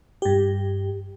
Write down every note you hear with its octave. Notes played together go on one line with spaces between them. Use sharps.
G2 G4